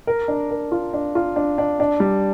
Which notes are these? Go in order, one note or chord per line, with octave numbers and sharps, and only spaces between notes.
A#4
D4
A#4
F4
D4
F4
D4
D4
D4
G3